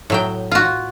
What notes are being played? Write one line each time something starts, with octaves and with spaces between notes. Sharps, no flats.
A2 F#3 G5
F4 F#4